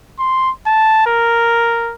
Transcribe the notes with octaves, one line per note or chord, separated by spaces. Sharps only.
C6
A5
A#4